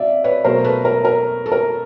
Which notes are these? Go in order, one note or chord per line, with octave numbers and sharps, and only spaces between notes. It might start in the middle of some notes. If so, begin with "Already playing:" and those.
Already playing: C3 D5 E5 F5
B4 C#5
B2 F#3 A3 A#4 C5
A4 B4
A#4
A#4
A4
A#4